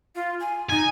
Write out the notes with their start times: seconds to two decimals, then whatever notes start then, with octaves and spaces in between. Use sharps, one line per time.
0.15 F4
0.40 G#5
0.69 D#4 G#5